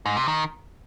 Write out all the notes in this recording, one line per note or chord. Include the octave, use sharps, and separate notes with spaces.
G#2
C3
D#3